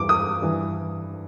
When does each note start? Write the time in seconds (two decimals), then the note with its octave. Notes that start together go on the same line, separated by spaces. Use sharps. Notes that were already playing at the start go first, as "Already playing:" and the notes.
Already playing: G2 E3 D6
0.09 D#6
0.42 G2 E3